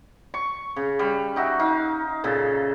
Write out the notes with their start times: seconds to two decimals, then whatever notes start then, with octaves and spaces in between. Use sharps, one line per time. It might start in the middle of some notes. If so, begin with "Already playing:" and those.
0.34 C#6
0.76 C#3
0.99 G3
1.36 D#4 F#4 E5
1.59 D#4 F5
2.24 A#2 C#3 A4